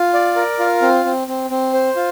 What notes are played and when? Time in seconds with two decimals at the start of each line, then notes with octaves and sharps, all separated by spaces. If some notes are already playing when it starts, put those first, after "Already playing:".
Already playing: F4
0.14 D5
0.36 A#4
0.59 F4
0.82 C4
1.05 C4
1.28 C4
1.50 C4
1.74 C5
1.96 F4